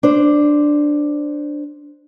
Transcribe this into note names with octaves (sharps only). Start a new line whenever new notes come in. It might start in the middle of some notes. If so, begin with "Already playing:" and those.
D4 C5